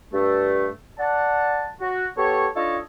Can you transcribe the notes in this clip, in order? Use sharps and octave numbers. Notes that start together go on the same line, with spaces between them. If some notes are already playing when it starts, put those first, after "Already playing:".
G2 A3
D5 F#5 A5
F#4
B3 G4 A4 C#5
D4 D#4 F4 A4 C#5 D#5